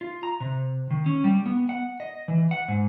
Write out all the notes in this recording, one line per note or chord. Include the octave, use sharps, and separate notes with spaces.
F4
A#5
C3
D#3
C#4
G3
B3
F#5
D#5
E3
F#5
G#2